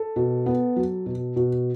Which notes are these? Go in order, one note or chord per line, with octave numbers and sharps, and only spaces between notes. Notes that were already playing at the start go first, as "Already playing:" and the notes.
Already playing: A4
B2
B3
F#3
B2
B2